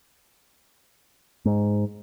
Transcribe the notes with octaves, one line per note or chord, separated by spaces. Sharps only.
G#2